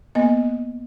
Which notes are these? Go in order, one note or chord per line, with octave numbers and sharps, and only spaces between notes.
A#3 B3 D#5